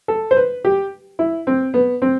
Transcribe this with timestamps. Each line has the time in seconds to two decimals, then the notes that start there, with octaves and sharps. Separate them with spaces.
0.08 A4
0.31 C5
0.37 B4
0.64 G4
1.19 E4
1.47 C4
1.74 B3
2.02 C4